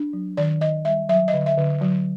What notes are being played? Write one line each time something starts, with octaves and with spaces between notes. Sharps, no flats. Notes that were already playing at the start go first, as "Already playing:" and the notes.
Already playing: D4
F#3
D#3 D5
D#3 D#5
G3 E5
F#3 E5
D#5
D3
E5
D3
F#3